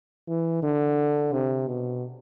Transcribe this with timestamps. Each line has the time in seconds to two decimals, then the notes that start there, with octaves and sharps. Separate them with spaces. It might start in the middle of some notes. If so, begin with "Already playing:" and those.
0.28 E3
0.63 D3
1.32 C3
1.67 B2